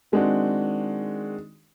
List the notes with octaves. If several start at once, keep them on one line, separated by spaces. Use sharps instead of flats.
D#3 G#3 C4 D4 F#4